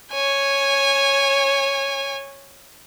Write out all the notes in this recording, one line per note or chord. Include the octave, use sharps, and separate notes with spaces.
C#5 G#5